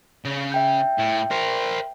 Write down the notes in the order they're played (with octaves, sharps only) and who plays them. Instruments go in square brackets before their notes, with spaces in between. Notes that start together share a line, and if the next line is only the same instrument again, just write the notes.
[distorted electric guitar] C#3
[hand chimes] E5 G5 G6
[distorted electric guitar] A2
A#4 C5